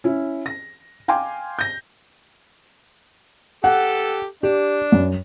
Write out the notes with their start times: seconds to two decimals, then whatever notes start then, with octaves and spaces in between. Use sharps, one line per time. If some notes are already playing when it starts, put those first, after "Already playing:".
0.04 C#4 E4
0.46 A#6
1.08 F5 G5 G#5 C6 D6
1.59 G6 A#6
3.64 G4 A4 F#5
4.43 D4 G4
4.92 F#2